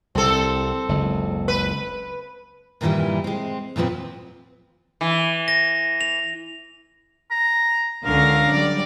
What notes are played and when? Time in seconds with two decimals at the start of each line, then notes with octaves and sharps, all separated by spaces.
0.15 C2 C4 A4
0.89 F#1 C#2
1.48 B4
2.81 G2 A#2 D#3 E3 G3 E4
3.24 G#3 C4
3.76 F#2 A#2 F3 B3 C4
5.01 E3
5.48 A#6
6.01 F7
7.31 A#5
8.05 C#2 D3 C#4 A#4 F5 A#6
8.53 F#3 G3 D5